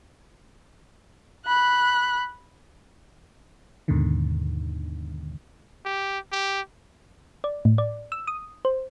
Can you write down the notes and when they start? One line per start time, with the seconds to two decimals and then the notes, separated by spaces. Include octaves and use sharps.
1.45 B5 F#6
3.88 D#2 G#2 B2 D3 D#3
5.85 G4
6.32 G4
7.44 D5
7.65 A2
7.78 D5
8.12 E6
8.27 D#6
8.65 C5